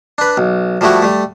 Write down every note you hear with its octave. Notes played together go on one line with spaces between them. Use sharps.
D4 B4
B1
F3 G3 A3 E4 F#4
G3 A3